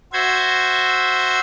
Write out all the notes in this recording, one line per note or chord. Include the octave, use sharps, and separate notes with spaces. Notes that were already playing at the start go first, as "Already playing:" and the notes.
F#4 C5 E5 G#6